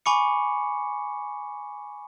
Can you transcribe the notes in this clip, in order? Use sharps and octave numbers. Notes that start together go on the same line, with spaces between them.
G#5 B5 C#6 D6 C#7